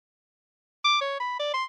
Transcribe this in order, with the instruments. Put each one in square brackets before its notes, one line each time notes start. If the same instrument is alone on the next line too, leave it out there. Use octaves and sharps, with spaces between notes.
[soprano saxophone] D6
C#5
B5
D5
C6